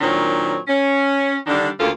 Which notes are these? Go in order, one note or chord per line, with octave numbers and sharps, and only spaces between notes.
A#2 D#3 F#3 C4 D4 C#5
C#4
D3 D#3 G3 D4
D2 C#3 A#3 F4 A4